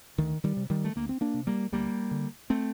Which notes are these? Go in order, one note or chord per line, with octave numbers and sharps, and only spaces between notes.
D2 D#3
D#3 G3
C3
D#3 G3
A3
D2 A#3
C4
A#3 D4
C3
G3 A#3
D2 G3 A#3
D3
A3 C4